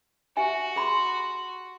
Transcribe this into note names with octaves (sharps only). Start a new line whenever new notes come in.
F#4 G4 E5 G#5
G#4 B5 C6